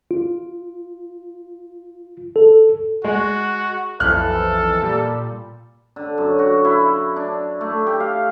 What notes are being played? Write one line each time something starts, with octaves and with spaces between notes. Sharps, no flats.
F4
A4
G#3 F#4
B1 F2 E3 A4 F6 F#6
A#2 G3
D3
F#2
F#4
E4
D4
A3
G4
F5